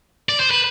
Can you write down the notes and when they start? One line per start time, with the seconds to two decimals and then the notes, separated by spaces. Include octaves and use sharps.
0.29 D5
0.40 C5
0.51 B4